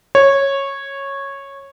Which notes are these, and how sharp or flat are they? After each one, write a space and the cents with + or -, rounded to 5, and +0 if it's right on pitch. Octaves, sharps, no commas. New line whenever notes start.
C#5 -10